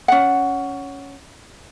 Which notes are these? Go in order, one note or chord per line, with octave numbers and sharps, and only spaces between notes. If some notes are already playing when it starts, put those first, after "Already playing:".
C#4 F#5